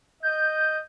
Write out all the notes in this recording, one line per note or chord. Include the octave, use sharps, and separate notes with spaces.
D#5 G6